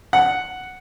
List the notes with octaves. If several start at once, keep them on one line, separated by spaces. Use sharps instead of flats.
F#5